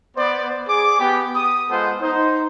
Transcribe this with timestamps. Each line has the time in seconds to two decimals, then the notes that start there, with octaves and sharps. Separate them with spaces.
0.16 B3 C5 D5
0.68 G#4 D6
0.99 B3 G4
1.35 D#6
1.69 G#3 B3 F4 A4 C5 F#5
2.02 D#4 C5